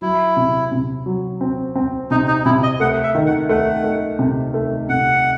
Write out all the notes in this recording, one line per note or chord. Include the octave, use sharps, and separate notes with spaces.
F#3 E4
C3
C3
F#3
C4
C4
C3 D#4
D#4
C3 E4
D#5
A3 F#5
E5
D#3
F#5
A3 F#5
A3
C3
A3
C3 F#5